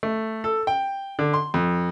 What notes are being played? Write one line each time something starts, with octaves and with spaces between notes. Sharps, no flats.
A3
A4
G5
D3
C6
F2